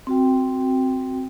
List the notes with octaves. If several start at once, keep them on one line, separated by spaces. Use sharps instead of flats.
C4 F#4 G5